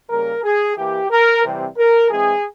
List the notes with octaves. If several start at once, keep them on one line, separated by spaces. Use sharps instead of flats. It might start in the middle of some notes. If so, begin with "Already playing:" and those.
C#3 G3 A#3 A#4
G#4
E3 A#3 G4
A#4
C3 E3 G3 C4
A#4
E3 G#3 C4 G#4